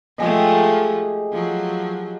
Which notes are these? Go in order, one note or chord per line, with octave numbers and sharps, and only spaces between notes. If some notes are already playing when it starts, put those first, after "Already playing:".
F3 G#3 A3 G4 G#4 D#5
F3 F#3